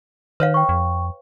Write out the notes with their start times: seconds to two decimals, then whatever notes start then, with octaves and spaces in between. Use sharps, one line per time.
0.40 D#3 B4 C#5 F5
0.54 G5 C#6
0.69 F2